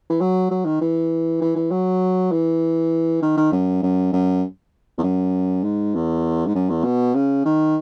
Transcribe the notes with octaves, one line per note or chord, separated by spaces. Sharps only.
E3
F#3
F#3
D#3
E3
E3
E3
F#3
E3
D#3
D#3
F#2
F#2
F#2
E2
F#2
G#2
E2
G#2
F#2
E2
B2
C#3
D#3